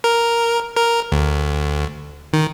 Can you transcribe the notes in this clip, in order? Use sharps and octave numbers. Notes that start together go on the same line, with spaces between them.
A#4
A#4
D2
D#3